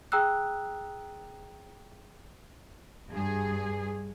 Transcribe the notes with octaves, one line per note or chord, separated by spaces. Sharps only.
G#4 G5 A#5 D#6 E6 F#6
G2 G#4